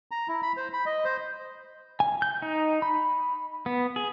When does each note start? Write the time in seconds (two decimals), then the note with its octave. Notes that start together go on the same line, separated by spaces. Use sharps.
0.11 A#5
0.28 E4
0.42 B5
0.57 C5
0.73 B5
0.86 D#5
1.05 C5
2.00 G#5
2.22 G6
2.42 D#4
2.82 B5
3.66 B3
3.96 G#4